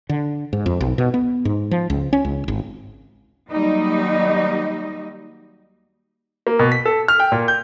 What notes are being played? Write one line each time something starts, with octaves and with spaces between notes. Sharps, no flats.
D3
G#2
F2
B1
B2
B3
G#2
F3
C#2
C#4
C#2
G#1
D#2 F#3 G3 D#4 D#5
A#3
B2
B6
A4
F6
G5
A#2
G6